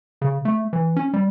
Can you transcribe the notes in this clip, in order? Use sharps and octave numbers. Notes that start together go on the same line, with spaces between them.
C#3
A3
E3
C#4
G3